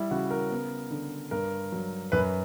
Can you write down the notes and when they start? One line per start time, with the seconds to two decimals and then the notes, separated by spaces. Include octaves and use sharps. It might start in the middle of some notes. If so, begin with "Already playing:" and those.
Already playing: G3 E4
0.11 C#3 F#4
0.30 A#4
0.50 B3
0.91 D3
1.31 G2 A#4
1.72 F#3
2.12 F#2 B4